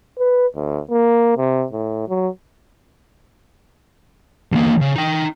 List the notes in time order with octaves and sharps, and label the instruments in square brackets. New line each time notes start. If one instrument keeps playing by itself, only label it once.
[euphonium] B4
D2
A#3
C3
A2
F#3
[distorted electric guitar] E2 A#3
C#3
D#4 G5